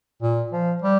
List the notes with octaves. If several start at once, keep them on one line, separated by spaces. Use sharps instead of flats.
A#2
F3
G3